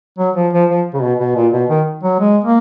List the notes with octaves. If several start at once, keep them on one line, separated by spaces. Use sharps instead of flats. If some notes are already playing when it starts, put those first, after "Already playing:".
F#3
F3
F3
F3
C#3
B2
B2
A#2
B2
D#3
F#3
G#3
A#3